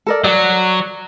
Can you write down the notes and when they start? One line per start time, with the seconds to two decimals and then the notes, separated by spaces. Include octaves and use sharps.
0.07 A4 A#4 D5
0.24 F#3 D5